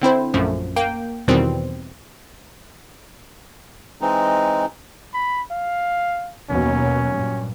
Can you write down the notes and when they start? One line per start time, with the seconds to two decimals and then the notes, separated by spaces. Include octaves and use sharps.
0.02 D3 C4 E4 C5
0.34 A#1 F#2 F3 A3
0.76 A#3 G5
1.28 E2 B2 D#3 E3 G3 C4
4.01 E3 G#3 C4 D#4
5.14 B5
5.51 F5
6.49 D#2 B2 F#3 C#4
7.14 G2 A#2